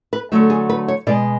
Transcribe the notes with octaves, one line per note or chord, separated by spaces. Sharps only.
B4
D3 F#3 A3 A4
G#4
B4
C#5
B2 G#3 D5